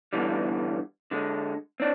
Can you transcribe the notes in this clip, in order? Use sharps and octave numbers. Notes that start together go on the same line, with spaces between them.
G2 B2 D3 E3 G3
D3 G#3
C4 D4